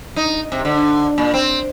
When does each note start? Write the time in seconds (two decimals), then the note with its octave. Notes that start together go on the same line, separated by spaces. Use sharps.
0.16 D#4
0.52 C3
0.65 D3
1.18 A#2
1.34 C4